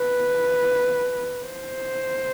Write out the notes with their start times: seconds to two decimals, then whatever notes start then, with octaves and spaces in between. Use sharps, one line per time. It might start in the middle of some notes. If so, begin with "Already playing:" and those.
Already playing: B4
1.46 C5